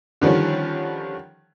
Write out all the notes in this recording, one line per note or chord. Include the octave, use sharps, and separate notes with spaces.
D3 D#3 F3 G3 C#4